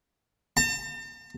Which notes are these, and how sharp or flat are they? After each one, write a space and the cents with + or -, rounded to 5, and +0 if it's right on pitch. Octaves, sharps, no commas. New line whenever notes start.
A5 +45